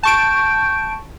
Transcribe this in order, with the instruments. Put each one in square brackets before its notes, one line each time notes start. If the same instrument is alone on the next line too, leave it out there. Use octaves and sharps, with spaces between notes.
[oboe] G5 [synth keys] A5 C#6 D7